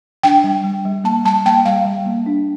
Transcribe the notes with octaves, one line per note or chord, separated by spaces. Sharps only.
D4 G5
G3
G3
G3
A#3 A5
G3 A5
A#3 G5
G3 F5
G3
A#3
D4